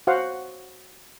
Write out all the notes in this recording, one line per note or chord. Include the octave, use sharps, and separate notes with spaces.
F#4 C5 F5 F#5